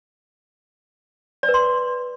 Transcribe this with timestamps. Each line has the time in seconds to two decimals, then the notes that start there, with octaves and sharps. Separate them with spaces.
1.43 D5
1.49 B4
1.54 C6